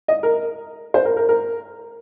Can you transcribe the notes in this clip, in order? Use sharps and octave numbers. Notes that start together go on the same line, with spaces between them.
D#5
A#4
C5
A#4
A#4
A#4